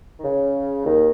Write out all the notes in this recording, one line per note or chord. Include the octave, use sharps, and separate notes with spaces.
D#3
C#3
D#2 D#3